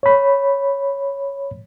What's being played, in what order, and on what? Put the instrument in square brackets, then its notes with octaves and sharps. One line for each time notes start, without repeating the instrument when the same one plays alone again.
[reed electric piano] C#5 B5